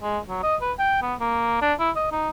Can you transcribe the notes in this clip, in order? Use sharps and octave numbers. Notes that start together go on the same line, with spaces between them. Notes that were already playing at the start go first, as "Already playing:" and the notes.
G#3
F#3
D#5
B4
G5
B3
A#3
D4
E4
D#5
D#4